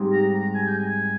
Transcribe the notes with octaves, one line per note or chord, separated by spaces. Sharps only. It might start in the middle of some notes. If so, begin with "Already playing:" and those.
Already playing: G#2 G3 C4 D#4 G4
A#5
A#5
G#5
G5
G#5